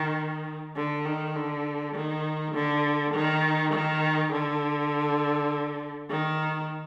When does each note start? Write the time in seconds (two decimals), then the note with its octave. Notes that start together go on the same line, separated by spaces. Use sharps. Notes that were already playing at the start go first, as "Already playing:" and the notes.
Already playing: D#3
0.76 D3
1.05 D#3
1.35 D3
1.95 D#3
2.54 D3
3.13 D#3
3.73 D#3
4.32 D3
6.10 D#3